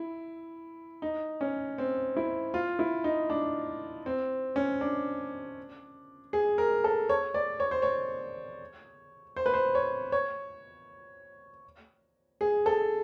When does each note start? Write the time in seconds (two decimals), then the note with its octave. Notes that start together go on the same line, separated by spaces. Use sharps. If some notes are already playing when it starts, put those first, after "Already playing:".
Already playing: E4
1.02 D#4
1.41 C#4
1.78 C4
2.17 E4
2.54 F4
2.79 E4
3.04 D#4
3.30 D4
4.06 C4
4.56 C#4
4.81 D4
6.33 G#4
6.58 A#4
6.84 A4
7.09 C#5
7.34 D5
7.60 C#5
7.71 C5
7.82 C#5
9.36 C5
9.46 B4
9.54 C5
9.75 C#5
10.12 C#5
12.41 G#4
12.66 A4